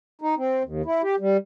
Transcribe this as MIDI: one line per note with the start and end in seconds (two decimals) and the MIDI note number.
0.21 0.35 63
0.37 0.63 60
0.64 0.82 39
0.85 1.02 64
1.02 1.15 67
1.20 1.37 55